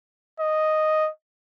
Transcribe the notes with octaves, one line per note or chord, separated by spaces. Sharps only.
D#5